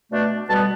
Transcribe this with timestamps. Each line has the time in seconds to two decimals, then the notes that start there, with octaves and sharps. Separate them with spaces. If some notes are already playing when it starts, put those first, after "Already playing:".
0.11 B2 A3 D4
0.48 B2 G3 B3 A5